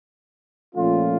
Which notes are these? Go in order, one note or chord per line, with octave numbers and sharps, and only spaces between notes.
A#2 F3 A3 C#4 F4